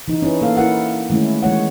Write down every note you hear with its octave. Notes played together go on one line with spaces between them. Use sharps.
E3 D#4
C#4 E4 B4
A#3 A4 F5
E4 A#4 F#5
D#3 G#3 A3 C#4 E4
E3 G#3 C#5 F#5